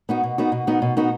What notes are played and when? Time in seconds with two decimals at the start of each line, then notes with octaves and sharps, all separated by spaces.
0.09 B3 D#4 F#4
0.23 B2
0.38 B3 D#4 F#4
0.52 B2
0.67 B3 D#4 F#4
0.82 B2
0.97 B3 D#4 F#4